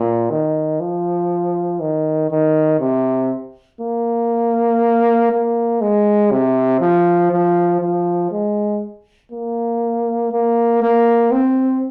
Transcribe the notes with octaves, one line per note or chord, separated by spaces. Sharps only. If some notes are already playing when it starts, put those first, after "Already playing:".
Already playing: A#2
D#3
F3
D#3
D#3
C3
A#3
A#3
G#3
C3
F3
F3
F3
G#3
A#3
A#3
A#3
C4